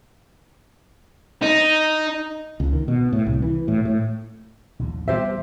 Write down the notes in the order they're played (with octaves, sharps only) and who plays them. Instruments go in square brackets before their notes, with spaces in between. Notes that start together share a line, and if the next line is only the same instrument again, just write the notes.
[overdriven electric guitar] D#4
[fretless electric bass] C#2
D#3
B2
A2
C2
E3
A2
A2
[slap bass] A#1 D#2 A2
[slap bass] E2 A#2 G3 [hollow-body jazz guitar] G4 C5 E5